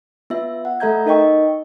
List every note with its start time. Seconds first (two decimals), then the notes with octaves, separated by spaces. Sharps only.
0.30 B3 F4 E5
0.65 F#5
0.80 A3 A4 E5 A#5 G6 G#6
1.06 D#4 A#4 D#5 G5 C#6